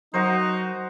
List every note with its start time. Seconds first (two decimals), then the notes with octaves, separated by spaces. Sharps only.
0.14 F#3 D#4 F#4 A#4 C5